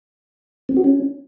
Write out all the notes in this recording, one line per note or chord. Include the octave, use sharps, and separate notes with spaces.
C4
F#4
C#4